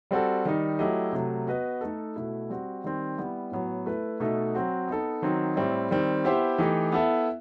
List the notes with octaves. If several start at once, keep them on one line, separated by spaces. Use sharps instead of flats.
G3 C4 F#4 A4
D#3 G3 D#4
F#3 A3 E4 G4 D#5
C3 F#3 A3
B3 F#4 B4 D#5
A3 D#4 A4
B2 A3 E4
G3 C4 F#4
D#3 G3 C4
G3 B3 E4
A2 F#3 B3
A3 E4 B4
B2 A3 D#4 A4 E5
F#3 C4 F#4
B3 D#4 A4
D#3 F#3 C4 D#4
A2 G3 C4 E4
D#3 G3 C4
B3 E4 G4 C5 E5
E3 A3 D#4 G4
B3 E4 A4 E5